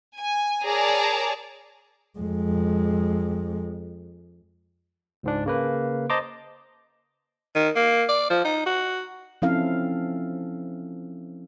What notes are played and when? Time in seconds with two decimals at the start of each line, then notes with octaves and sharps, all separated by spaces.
0.15 G#5
0.65 G#4 A#4 C#5 D5 A5 A#5
2.19 F2 G#3
5.23 C#2 G#2 D4
5.46 C#3 A#3 B4
6.10 C5 D#5 A5 A#5 C6 D6
7.55 D#3
7.76 A#3
8.09 D5
8.30 F3
8.45 D#4
8.66 F#4
9.42 F3 C4 C#4 E4 A4 F5